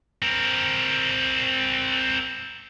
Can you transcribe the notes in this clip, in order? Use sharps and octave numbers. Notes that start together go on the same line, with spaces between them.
C4 A#4